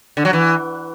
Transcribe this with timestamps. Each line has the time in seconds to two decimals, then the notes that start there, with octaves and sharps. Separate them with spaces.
0.17 D3
0.25 F#3
0.33 E3